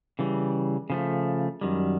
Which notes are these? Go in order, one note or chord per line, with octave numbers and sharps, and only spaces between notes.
C#3 E3 G3
C#3 F3 A3
F#2 D#3 G3